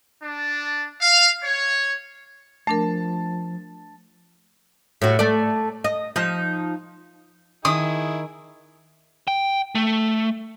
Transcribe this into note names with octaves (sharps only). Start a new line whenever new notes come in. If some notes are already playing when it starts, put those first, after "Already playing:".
D4
F5
C#5
F3 A3 D4 A#4 A5
A2 F#4
A3 A4 D5
D#5
F3 D#4
D#3 E4 G#4 D#6
G5
A3